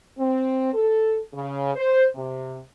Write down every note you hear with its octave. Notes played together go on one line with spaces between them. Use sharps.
C4
A4
C#3
C5
C3